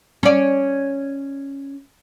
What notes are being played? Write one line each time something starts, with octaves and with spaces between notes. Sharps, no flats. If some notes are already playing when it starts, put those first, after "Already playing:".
C#4 D5